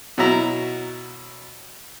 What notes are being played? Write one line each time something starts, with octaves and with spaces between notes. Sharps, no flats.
B2 F#3 E4 A#5